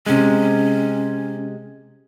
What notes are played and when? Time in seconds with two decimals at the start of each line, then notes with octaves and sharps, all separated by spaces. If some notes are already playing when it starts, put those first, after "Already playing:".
0.06 C3 G#3 C#4